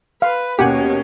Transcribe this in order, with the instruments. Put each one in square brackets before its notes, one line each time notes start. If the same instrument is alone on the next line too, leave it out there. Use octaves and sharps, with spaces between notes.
[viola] B4 [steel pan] F5
[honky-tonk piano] D#2 B2 [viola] A#3 C#4 [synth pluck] G4 F#5 G#5